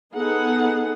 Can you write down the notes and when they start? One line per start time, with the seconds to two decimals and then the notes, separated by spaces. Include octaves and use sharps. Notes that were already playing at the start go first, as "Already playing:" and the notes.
0.15 B3 D#4 G#4 A4 F#5